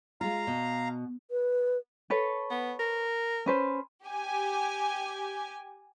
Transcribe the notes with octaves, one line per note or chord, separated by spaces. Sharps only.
G#3 F4 F5 A#5
B2
B4
A4 B4 C#5
B3
A#4
C#4 B4 C5
G4 G#5